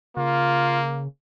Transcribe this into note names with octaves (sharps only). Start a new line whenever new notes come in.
C#3 A#3 F4